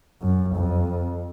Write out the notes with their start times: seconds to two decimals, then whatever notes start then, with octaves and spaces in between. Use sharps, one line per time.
0.22 F#2
0.56 F2